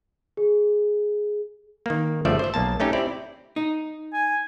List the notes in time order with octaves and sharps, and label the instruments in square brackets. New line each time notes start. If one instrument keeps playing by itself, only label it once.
[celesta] G#4
[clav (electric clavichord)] D#3 A#3
G1 C#3 F3 A3 D5 E5
C5 E5
B1 A#3 A5
A3 C#4 D#4 G4
C4 E4 G4 D5
[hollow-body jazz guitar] D#4
[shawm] G#5